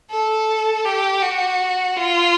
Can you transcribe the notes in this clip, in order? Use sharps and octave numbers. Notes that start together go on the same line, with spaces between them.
A4
G4
F#4
F4